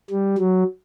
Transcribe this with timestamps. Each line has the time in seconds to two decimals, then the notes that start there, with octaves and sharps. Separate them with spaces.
0.10 G3
0.38 F#3